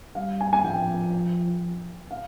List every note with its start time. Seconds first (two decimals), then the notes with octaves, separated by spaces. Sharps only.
0.15 G3 F5
0.41 G#5
0.53 G#5
0.64 F3 G5
2.11 F5